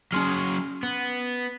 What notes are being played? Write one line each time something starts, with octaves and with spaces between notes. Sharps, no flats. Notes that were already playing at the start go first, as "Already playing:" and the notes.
F#3 C#4 G#4 C6 F6
B3